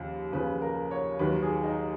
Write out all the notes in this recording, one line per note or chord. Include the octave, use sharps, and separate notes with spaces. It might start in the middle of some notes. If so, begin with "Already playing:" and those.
Already playing: D#2 C#3 F3
D#2 C#3 F3 B4
A#4
C#5
D#2 D#3 F#3 B4
G#4
D#4